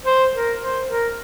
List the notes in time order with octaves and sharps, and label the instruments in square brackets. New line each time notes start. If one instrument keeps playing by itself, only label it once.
[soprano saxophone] C5
A#4
C5
A#4